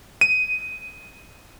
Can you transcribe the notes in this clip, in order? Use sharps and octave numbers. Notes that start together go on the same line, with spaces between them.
D#7